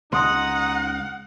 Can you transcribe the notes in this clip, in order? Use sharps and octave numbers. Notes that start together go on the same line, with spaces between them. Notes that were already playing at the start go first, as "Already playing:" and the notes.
C#2 D#4 F#5 A#5 C6 D#6